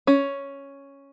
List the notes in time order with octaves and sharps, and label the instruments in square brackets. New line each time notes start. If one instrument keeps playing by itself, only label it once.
[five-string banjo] C#4